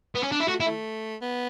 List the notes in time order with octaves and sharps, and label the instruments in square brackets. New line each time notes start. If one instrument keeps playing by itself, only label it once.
[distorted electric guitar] B3
C#4
D4
E4
[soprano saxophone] A3 [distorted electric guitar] F#4
[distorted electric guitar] E4
[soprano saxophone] A3
B3